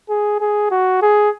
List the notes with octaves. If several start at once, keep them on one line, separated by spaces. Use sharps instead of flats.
G#4
G#4
F#4
G#4